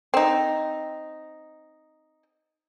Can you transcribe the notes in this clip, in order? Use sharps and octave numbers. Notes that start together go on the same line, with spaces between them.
C4 D#4